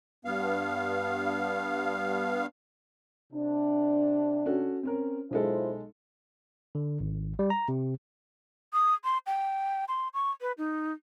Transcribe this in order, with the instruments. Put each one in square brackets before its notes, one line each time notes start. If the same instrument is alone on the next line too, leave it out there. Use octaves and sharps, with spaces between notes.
[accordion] G2 B3 F5
[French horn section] C3 D4
[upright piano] C#4 F#4 A4
C4 C#4 A#4
[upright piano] B1 G#3 A4 [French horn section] E4 F4 C5
[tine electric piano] D3
G#1
G3
A#5
C3
[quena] D#6
C6
G5
C6
C#6
B4
D#4